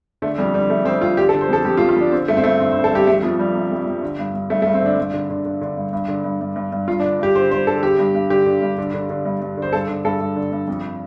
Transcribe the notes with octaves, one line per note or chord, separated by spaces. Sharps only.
D3 A3
F2 G3
D3 G3
F2 A3
F2 C4
F2 F4
D3 G4
A4
D3
C5
F2 A4
F2 G4
F4
F2
F4
F2 D4
D3 C4
G2 A3
C4
G2 A3
D3 C4
C5
D3
A4
G2 G4
F2 A3
F2 F3
F2 G3
C3
F2
F2
D3
G2
G2
G2 A3
A3
G2
C4
D3 D4
G2
D3
D3
D3
D3
G2
G2
D3
G2
G2
G2
G2
G2 F4
D4
D3
G2 G4
D3 C5
G2 C5
D3 A4
D3 G4
G2
G2
D3 G4
D3
G2
D3
D3
D3
G2
G2
D3 C5
G2 A4
D3
G2 A4
G2
D3
G2
F2